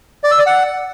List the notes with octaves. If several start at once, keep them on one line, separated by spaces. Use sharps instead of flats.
D5
E6
D5
F#5